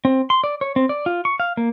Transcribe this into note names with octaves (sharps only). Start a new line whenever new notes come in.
C4
C6
D5
C#5
C4
D5
F4
C#6
F5
A#3